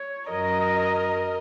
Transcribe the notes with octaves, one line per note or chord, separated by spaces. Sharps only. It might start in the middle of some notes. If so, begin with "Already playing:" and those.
Already playing: C#5
F#2 F#3 A#4 D#5